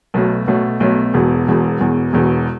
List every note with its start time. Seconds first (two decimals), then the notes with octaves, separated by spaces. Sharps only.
0.14 B1 B2 F#3 A3
0.47 B1 B2 F#3 A3
0.80 B1 B2 F#3 A3
1.14 E1 E2 B2
1.47 E1 E2 B2
1.80 E1 E2 B2
2.13 E1 E2 B2